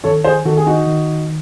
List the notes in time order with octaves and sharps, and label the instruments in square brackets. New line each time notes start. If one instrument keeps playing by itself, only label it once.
[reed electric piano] D#3 [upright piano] A4 C#5
[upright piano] G#4 C5
[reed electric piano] D#3 [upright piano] F#4 A4
[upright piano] G#4
D#4 F#4
[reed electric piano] D#3